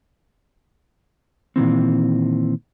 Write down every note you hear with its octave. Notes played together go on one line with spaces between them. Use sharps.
A#2 D#3 E3 C4